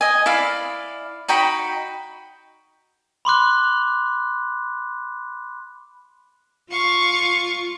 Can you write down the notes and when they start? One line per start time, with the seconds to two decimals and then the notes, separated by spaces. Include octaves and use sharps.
0.01 D#5 G#5
0.26 E4 D5 F5
1.28 D#4 F#4 G5 B5
3.25 B5 C6 D6 F#6
6.71 F4 F5 C#6